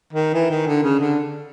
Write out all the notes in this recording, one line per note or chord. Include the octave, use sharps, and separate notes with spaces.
D#3
E3
D#3
D3
C#3
D3